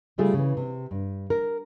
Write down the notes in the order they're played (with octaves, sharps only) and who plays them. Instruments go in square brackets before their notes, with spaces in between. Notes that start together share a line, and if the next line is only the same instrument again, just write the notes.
[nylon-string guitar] C#3 G3 A3 F4 G#4
C#3 E3
C3
G2
A#4